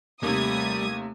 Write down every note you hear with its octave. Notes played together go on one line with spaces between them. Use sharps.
D#2 C3 G3 A3 D#6 G#6